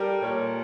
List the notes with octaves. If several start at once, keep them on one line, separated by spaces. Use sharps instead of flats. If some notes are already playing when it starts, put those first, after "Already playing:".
Already playing: G3 A4 A#4
A#2 C#5